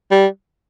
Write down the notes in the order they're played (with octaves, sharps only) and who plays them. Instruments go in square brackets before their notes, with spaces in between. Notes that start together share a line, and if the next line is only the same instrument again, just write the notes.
[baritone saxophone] G3